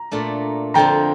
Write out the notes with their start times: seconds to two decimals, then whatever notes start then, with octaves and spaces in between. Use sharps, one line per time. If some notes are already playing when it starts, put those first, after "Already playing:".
Already playing: A#5
0.12 A#2 A3 D4
0.74 F2 D3 F3 C4 G5 A#5